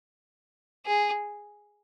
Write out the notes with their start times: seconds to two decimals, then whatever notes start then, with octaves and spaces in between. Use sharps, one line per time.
0.86 G#4